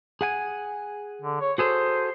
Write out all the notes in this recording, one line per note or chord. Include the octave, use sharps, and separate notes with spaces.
G#4 F#5 G#5
D3
C#5
F#4 G#4 A4 C5